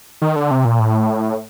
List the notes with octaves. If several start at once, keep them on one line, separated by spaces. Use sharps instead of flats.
D#3
D3
C3
A#2
A2